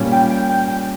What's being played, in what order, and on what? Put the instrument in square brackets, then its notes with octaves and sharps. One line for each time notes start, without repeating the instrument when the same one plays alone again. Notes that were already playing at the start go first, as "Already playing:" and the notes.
Already playing: [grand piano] A#2 G3 C#4
[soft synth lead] G5
G5
G5
G5